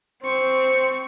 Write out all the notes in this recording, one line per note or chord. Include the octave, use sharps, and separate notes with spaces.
C4 C5 C#6